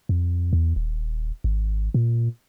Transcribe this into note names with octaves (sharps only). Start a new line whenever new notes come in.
F2
E2
D#1
G#1
A#2